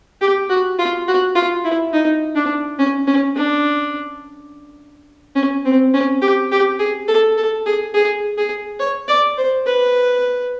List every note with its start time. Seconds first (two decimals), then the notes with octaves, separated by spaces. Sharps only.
0.21 G4
0.50 F#4
0.79 F4
1.08 F#4
1.36 F4
1.65 E4
1.94 D#4
2.35 D4
2.79 C#4
3.07 C#4
3.36 D4
5.36 C#4
5.65 C4
5.94 C#4
6.22 G4
6.52 G4
6.79 G#4
7.08 A4
7.37 A4
7.66 G#4
7.94 G#4
8.38 G#4
8.80 C#5
9.08 D5
9.38 C5
9.66 B4